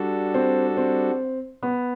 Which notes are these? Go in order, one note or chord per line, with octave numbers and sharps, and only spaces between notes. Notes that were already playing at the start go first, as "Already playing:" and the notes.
Already playing: G3 D4 F#4 A4
C4
C4
B3